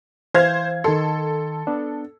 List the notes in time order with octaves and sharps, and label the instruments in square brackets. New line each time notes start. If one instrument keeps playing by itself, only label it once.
[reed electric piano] E3 F5 [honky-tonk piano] C5 G#6
[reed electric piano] D#3 A5 C6 [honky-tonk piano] A4
[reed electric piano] B3 D4